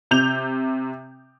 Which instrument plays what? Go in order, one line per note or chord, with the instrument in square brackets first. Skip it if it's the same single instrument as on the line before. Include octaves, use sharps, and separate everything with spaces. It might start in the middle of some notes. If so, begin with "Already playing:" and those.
[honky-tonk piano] C3 G6 F7